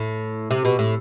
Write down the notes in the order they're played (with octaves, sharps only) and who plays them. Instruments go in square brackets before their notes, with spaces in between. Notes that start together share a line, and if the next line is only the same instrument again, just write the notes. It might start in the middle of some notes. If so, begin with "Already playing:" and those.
Already playing: [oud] A2
C3
B2
A2